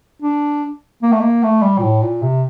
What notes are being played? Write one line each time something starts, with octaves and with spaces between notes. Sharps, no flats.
D4
A#3
A3
A#3
A3
G3
A#2
A2
A#2
C3